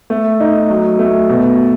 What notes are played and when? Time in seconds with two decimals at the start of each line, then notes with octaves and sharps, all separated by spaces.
0.10 A3
0.40 D#4
0.70 F#3
0.99 A3
1.29 B2